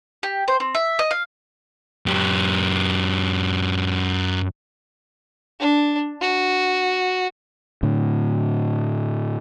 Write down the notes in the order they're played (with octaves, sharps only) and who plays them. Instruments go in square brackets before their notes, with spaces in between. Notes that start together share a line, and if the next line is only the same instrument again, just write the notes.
[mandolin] G4
C5
C4
E5
D#5
F5
[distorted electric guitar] F#2 G4
[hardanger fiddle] D4
F#4
[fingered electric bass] A2 D3